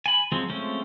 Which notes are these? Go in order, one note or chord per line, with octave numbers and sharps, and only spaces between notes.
G#5 B5
F3 F#3 G#3 C4
F3 G#3 A3 C4 C#4